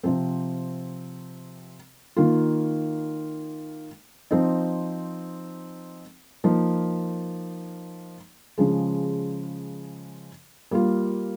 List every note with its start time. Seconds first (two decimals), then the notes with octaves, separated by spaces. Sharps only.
0.04 C3 F3 C4
2.16 D#3 A#3 F4
4.31 F3 C4 D#4
6.44 F3 A#3 D#4
8.58 C#3 F3 G#3
10.71 G3 A#3 F4